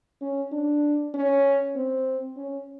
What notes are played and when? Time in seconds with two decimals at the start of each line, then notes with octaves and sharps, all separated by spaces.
0.21 C#4
0.52 D4
1.14 C#4
1.76 C4
2.37 C#4